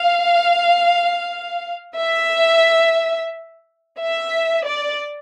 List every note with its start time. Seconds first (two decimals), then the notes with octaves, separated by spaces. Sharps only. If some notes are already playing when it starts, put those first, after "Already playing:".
Already playing: F5
1.98 E5
3.99 E5
4.65 D5